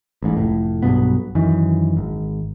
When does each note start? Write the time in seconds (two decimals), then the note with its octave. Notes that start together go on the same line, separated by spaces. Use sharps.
0.22 A1 G#2
0.37 F1 A2
0.83 B1 G2 B2 B3
1.35 F#2 D#3 E3
1.97 G#1